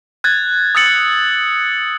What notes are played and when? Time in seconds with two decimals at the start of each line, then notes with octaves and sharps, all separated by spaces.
0.24 F#6 G#6 A6
0.75 D#6 E6 G#6 A6 C#7 F#7